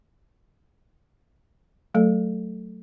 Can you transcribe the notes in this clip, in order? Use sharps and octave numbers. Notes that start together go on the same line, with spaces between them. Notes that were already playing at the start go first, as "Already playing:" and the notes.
F#3 A3 A4